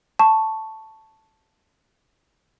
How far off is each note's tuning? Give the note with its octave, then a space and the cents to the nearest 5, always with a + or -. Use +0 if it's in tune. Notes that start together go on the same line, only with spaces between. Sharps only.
A5 +0 C#6 +0